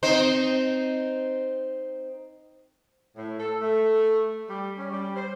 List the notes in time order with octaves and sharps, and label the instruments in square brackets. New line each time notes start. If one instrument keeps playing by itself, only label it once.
[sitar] C4 D#4 C5
[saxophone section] A2
A4
A3
G3
C#4
G3
C5